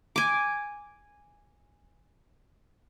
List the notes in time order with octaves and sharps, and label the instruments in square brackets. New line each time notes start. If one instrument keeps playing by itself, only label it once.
[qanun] G#5 D6